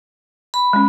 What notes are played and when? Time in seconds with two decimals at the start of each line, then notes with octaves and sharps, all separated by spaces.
0.54 B5
0.73 G#3 C#4